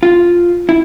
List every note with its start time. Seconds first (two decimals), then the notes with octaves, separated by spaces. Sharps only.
0.03 F4
0.69 E4